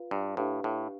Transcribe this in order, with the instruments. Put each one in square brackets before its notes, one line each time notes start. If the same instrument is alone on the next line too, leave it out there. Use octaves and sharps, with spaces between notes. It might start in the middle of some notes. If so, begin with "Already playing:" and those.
Already playing: [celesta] F4 B4 F5
[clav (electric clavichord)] G2
[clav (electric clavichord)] A2 [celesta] D4 G4 B4 F5
[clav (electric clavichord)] A2